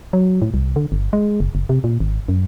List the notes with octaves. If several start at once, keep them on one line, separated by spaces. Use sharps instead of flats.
F#3
A2
C2
D3
G1
G#3
F#1
F#1
C3
A#2
G#1
F#2